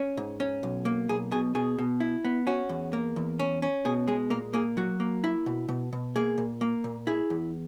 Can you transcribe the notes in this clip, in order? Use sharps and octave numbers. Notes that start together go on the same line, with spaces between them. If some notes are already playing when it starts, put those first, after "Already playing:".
Already playing: C#4
G#2
C#4
B1
A#3
B1 G#4
B2 G#4
B2 G#4
B2
E4
B3
C#4 F#4
E2
A#3
E2
C#4
C#4
B2 G#4
G#3 G#4
A#2 A#3 A#4
A#3 G#4
F#3 F#4
A#3
E4
B2
B2
B2
A#3 G#4
A#2
A#3
A#2
E4 G#4
E2